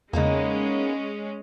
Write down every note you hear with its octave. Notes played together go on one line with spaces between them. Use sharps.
E2 C#3 G#3 A#3 B3 C#4 D#4